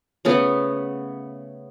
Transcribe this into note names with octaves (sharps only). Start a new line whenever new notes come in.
C#3 A3 B3